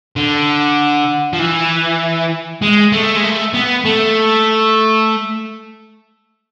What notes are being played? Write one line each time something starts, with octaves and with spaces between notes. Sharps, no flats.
D3
F3
E3
G#3
A3
G#3
A3
B3
A3